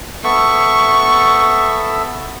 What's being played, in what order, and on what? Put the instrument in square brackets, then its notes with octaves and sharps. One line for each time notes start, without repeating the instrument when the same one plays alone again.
[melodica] B3 A4 E5 [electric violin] C#6